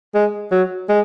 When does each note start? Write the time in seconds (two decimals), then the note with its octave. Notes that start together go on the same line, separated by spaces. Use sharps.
0.14 G#3
0.51 F#3
0.89 G#3